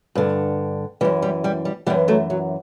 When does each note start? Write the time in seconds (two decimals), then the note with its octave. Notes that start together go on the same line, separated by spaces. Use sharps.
0.15 G2 D3
1.01 E3 G3
1.05 F#2
1.22 G3
1.44 G3
1.65 G3
1.86 E3 G3 B3
1.90 F#2
2.08 F#3 A3
2.30 F#3